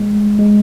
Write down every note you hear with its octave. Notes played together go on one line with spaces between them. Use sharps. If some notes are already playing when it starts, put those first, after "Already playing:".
Already playing: G#3
G#3